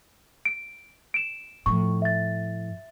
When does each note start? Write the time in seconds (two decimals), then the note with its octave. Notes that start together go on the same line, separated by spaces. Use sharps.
0.45 D7
1.14 D7 E7
1.66 A2 F3 C#6
2.02 E5 A6